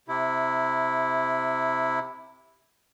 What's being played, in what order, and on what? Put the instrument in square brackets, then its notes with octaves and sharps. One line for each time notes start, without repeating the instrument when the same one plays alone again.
[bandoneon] C3 E4